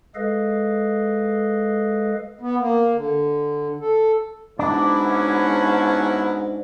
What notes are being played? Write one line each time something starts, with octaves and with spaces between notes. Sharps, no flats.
G#3 G#4 A4 B4 D#5 F5
B3
A#3
D3
A4
G#2 F#3 B3 D4 E4 D5
C#4